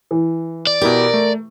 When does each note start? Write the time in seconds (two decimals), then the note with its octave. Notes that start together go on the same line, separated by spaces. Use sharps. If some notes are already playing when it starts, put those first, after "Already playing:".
0.11 E3
0.67 D5
0.81 B2 E4 G4 A#4
1.14 A3